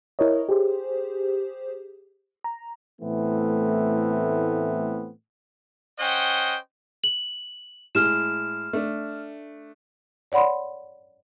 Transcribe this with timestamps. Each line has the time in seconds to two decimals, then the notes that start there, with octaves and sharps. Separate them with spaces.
0.19 E4 A#4 C#5 D#5
0.49 G4 G#4 C5
2.44 A#5
3.01 A2 E3 A3 B3 C4
5.98 C#4 C5 D#5 F#5 G5
7.04 F#7
7.95 A2 G#3 F6 E7
8.73 A3 D4
10.32 C#5 D5 F#5 B5 C6